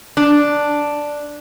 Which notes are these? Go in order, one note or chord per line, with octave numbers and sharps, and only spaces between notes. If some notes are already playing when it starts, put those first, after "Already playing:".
D4